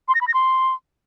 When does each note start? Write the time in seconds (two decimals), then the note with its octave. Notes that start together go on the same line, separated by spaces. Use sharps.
0.08 C6
0.15 A#6
0.21 B5
0.27 A#6
0.34 C6